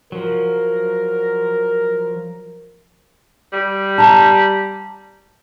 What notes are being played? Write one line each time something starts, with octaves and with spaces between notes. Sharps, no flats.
F3 F#3 A#4
G3
A5 A#5